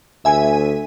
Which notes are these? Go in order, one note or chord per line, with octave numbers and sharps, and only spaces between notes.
D2 E5 G#5